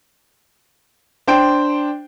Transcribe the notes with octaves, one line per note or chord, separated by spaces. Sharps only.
D4 C5 G5 D7